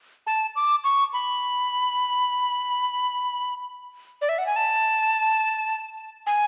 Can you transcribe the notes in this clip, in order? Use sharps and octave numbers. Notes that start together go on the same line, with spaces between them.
A5
D6
C#6
B5
D5
E5
F#5
G#5
A5
G#5